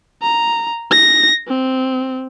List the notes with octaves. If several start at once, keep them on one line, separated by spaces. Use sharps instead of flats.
A#5
A#6
C4